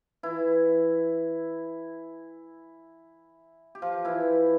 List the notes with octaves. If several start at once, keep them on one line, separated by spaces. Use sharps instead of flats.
E3 E4
G4
F3 F4
E3 E4